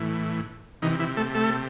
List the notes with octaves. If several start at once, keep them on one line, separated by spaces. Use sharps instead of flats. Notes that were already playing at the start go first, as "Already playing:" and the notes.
Already playing: A2 E3
C3 D#3 E3 D#4
E3 E4
A3 A4
A3 A4